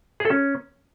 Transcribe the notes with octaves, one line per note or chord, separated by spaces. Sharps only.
G#4
A4
C#4